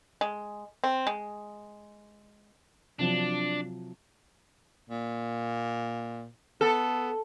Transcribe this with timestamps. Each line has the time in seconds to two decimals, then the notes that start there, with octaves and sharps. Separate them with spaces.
0.21 G#3
0.84 C4
1.07 G#3
2.99 C3 F3 F#3 D4
4.89 A#2
6.61 B3 A4